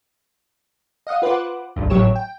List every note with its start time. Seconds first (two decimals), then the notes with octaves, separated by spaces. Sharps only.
1.07 D#5 F5 F#5 D#6
1.22 F4 B4 C5 F#5 D6
1.76 G#1 D2 G2
1.90 G#1 A2 F#3 G4 C#5 E7
2.16 G5